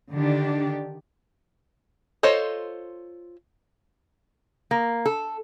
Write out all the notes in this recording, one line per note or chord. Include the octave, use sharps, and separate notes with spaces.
D3 D#3 D4 G4
F4 A4 C5 C#5 D#5
A#3
A4